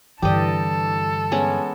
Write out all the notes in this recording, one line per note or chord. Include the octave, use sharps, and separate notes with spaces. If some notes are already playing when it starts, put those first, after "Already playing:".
G2 D3 E3 G4 A4 D5 D#5
G#3 B3 C#4